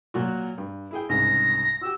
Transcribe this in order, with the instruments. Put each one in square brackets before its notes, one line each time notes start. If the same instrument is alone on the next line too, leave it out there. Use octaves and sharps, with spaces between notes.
[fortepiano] A#2 F#3 F#4
G2
E4 G#4 G5
[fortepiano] C2 G#2 C#3 [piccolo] A#6
[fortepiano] F#4 G4 [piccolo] E6